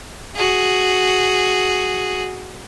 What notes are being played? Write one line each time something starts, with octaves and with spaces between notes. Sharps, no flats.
F#4 G#4